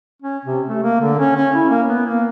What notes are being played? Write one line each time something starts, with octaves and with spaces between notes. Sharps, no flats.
C#4
C3
A3
A#3
D3
C#4
C#4
E4
A#3
B3
A#3